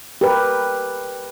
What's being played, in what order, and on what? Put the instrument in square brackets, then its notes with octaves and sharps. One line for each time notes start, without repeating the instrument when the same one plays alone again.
[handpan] G4 A#4 B4